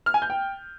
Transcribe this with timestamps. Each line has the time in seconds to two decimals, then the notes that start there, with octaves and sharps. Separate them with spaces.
0.06 F6
0.14 G#5
0.22 G6
0.30 G5